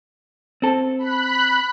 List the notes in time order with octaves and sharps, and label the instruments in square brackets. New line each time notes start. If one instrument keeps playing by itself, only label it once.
[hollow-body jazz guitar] C4 A4
[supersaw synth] B5 F#6